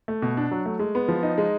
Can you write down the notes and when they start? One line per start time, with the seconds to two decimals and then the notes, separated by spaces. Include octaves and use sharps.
0.08 A3
0.22 B2
0.37 D4
0.51 F#3
0.66 A3
0.79 G#3
0.95 B3
1.08 F3
1.23 D#4
1.38 G#3